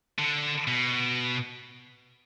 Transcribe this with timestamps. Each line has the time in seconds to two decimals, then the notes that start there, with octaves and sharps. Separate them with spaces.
0.18 D3
0.67 B2